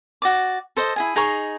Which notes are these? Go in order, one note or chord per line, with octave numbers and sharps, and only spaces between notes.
F#4 D5 D6
A4 C5 D#5
E4 G#4 G#5
D#4 G#4 A#5 C#6